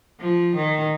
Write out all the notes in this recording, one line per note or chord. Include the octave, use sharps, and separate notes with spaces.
F3
D#3